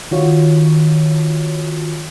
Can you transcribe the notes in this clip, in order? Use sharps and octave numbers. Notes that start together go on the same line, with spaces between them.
D#3 F4 F#4 C#5